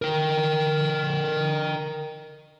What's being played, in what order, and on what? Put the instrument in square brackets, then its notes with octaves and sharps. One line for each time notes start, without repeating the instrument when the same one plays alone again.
[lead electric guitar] A#4 G5